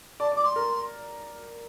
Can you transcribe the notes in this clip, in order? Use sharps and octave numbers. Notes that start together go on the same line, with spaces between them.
D5 A5
D5 D6
C6
A#4